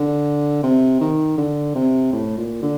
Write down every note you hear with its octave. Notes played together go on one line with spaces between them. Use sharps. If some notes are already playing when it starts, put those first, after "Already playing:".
Already playing: D3
C3
D#3
D3
C3
A2
A#2
D3